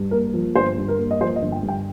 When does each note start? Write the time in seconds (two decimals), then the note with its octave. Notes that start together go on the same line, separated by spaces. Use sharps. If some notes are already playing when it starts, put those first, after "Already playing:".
Already playing: G2
0.11 A#3 A#4
0.34 F3
0.56 G1 C5
0.78 G2
0.88 A#4
0.99 A#3
1.11 D#5
1.21 F3 C5
1.36 D#5
1.42 G1
1.52 G5
1.63 G2
1.68 G5